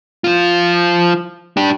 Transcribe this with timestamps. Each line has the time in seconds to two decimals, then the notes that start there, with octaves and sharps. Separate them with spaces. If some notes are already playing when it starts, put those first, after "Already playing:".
0.24 F3 F4
1.57 D4 G4